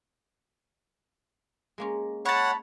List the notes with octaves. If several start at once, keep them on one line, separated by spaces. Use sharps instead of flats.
G#3 A#3 C#4
C#5 F#5 A5 B5 C#6